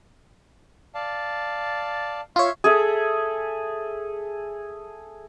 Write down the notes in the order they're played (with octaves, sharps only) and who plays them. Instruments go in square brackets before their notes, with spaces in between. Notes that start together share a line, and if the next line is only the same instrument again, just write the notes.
[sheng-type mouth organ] D5 F5 A5
[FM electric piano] F4 C#5 [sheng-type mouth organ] E5 C6
[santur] G#4 A4 E5